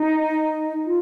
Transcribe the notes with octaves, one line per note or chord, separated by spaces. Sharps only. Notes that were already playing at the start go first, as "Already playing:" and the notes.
Already playing: D#4
F4